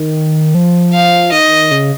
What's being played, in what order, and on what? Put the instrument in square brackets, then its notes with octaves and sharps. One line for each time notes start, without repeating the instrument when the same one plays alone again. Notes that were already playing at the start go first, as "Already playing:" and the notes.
Already playing: [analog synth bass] D#3
F3
[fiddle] F5
[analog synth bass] D#3 [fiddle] D#5
[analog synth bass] C#3